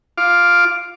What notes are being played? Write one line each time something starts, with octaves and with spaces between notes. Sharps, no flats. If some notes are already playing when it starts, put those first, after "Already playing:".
F4 F5 D6